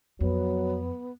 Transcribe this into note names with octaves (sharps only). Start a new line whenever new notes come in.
F2 F#3 B3